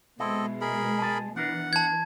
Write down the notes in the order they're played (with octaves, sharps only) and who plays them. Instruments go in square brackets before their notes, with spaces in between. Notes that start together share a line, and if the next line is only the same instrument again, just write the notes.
[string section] B2 G#3 [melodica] C4 A4 D#5 [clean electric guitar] E4
[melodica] G#4 A#4 B5
[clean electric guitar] G#5 A5
[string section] E3 [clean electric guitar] B3 D4 A#4 [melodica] F#5
[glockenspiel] A5 G#6